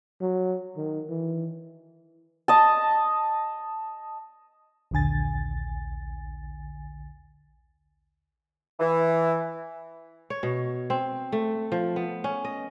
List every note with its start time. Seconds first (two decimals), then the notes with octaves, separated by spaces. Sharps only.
0.21 F#3
0.77 D#3
1.09 E3
2.48 D#5 A5
4.91 A#1 D#2 D3 G#5 A6
8.80 E3
10.30 C#5
10.43 B2
10.90 C4
11.32 A3
11.72 F3
11.96 B3
12.24 C#4
12.45 D#5